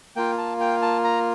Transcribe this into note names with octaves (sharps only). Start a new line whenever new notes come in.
A#3 F4 G5
A5
G5
A5
A#5